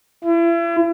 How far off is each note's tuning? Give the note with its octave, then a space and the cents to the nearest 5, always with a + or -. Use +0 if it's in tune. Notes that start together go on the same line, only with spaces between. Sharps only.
E4 +40